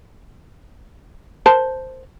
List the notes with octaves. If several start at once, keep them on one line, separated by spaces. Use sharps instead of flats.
A#4 C5 A5